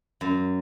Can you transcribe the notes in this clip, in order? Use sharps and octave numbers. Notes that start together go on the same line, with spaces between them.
F#2